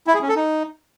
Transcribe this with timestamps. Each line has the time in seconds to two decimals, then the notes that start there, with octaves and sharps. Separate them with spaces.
0.07 E4
0.14 G#4
0.22 C#4
0.29 A4
0.36 D#4